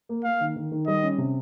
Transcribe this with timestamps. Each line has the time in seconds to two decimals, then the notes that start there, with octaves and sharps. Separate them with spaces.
0.09 A#3
0.24 A#3 F5
0.41 D#3
0.56 D#3
0.72 D#3
0.87 G3 D#5
1.03 C#4
1.18 C3